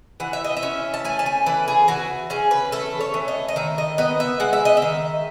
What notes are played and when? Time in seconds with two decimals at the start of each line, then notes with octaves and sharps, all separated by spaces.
0.20 E3 F#5
0.33 E5
0.44 D#5
0.57 E5
0.63 C#4
0.94 A5
1.05 A3 G#5
1.19 A5
1.26 G#5
1.46 E3 B4
1.68 G#4
1.88 E3 F#4
2.30 C#4 G#4
2.51 B4
2.72 A3 A4
3.01 C#5
3.14 E3
3.28 D#5
3.49 D#5
3.56 D#3 E5
3.78 D#5
3.98 B3 D#5
4.20 E5
4.40 G#3 F#5
4.53 E5
4.65 D#5
4.77 E5
4.82 D#3